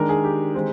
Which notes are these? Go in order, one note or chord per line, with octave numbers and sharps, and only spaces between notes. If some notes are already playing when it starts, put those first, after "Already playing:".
Already playing: D#3 G#3 D4 A#4
G#4
G4
D#3 G#3 C4